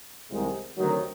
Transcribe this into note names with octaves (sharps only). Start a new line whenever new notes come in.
C2 C3 D#3 G#3
D2 C3 D#3 F#3